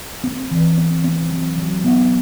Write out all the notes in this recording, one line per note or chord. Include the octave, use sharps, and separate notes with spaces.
C4
E3
C4
C4
F#3
F#3
B3